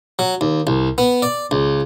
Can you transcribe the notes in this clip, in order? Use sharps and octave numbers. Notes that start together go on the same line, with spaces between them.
F#3
D#2
C2
B3
D5
C#2